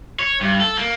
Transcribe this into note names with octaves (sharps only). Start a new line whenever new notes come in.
C#5
G2
A4
A#3